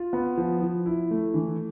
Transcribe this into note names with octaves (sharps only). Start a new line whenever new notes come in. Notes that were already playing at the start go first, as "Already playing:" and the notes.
Already playing: F4
B3
F3
F3
E4
A3
E3